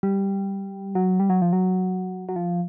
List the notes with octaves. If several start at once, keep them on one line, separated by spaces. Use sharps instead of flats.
G3
F#3
G3
F#3
F3
F#3
F#3
F3